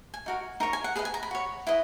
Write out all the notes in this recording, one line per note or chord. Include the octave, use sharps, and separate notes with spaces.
G#5
D#4 F#4 A#4
D#4 A#4 C#5 A#5
G#5
F#5
G#4 B4 D#5 F#5
G#5
A#5
B5
F#4 C#5
E4 B4 D#5